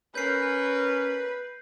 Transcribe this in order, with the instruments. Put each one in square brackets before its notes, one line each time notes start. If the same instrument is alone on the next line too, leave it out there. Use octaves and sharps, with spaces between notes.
[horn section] C#4 A#4 [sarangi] B4 [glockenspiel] G6 C7